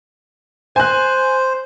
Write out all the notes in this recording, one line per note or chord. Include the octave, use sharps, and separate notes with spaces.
C5 G#5 F#6